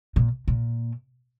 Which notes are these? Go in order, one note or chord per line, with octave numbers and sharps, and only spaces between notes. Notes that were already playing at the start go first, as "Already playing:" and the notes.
A#2
A#2